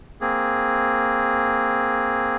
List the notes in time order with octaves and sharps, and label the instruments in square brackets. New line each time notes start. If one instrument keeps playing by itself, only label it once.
[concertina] A#3 C4 G#4